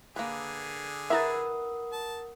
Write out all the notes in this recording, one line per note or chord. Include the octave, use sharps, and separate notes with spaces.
D3 A#3 G#4 B4
E4 A#4 B4 E5 F#5 A#5 D#6 A6
A5